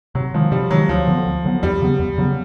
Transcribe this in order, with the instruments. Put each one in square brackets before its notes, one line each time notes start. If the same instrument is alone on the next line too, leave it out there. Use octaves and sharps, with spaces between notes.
[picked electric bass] C3 [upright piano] F#3
[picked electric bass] D#3 G#3 [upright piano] F3
[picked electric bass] C3 [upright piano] G3
[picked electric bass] D#3 G#3 [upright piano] F#3
[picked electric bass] D2 [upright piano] F3
[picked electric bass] D3 F#3 B3
D2
D3 F#3 B3
[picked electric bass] E2 [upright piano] G3
[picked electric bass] C#3 F#3 B3
E2
C#3 F#3 B3